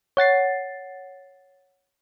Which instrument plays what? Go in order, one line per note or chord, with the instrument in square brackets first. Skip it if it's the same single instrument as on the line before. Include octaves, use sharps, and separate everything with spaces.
[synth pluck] C#5 F#5 A6 C7